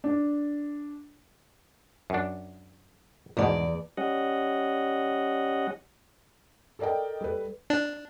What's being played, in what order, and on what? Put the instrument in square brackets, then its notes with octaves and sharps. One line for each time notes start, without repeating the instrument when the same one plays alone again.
[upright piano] D4
[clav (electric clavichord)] F#2 D4
[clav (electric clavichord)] G#1 G#2 B2 [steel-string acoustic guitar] E2 D5
[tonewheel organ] G3 C#4 D#5 F#5
[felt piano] A4 A#4 D5 D#5 G5
G3 A4 B4
[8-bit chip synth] D4